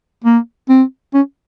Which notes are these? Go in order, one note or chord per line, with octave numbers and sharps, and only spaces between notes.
A#3
C4
C#4